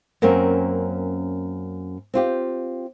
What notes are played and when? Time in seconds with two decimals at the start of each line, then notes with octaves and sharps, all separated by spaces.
0.22 F#2 A#3 C4 C#4 A#4
2.14 C4 F4 G4